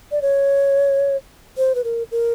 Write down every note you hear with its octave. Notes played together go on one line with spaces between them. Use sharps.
D5
C#5
C5
B4
A#4
A#4